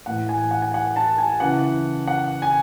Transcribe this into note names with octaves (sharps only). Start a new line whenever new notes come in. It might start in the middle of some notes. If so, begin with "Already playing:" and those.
A2 E3 F#5
G#5
F#5
G#5
F#5
A5
G#5
C#3 E3 F#5
F#5
G#5